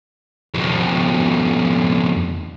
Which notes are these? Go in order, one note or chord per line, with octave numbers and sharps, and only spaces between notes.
F2 B2